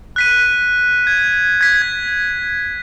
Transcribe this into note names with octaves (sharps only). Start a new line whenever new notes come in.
F#6 B6 D#7
G#6
G#6 B6
G#6